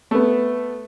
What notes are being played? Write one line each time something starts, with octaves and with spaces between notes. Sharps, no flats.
A3 B3